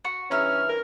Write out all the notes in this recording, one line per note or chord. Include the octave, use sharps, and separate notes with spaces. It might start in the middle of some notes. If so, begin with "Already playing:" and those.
F#4 C#6
G2 E3 C#4 E5 A#5 F6
A#4